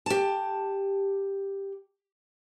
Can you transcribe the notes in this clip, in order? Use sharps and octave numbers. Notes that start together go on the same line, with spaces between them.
G4 A5